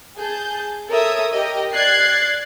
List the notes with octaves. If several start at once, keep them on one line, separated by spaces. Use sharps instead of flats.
G#4 A5 G6
A4 A#4 C#5 E5 D#6
G4 A#4 D#5
D5 F#6 G#6 A6 C7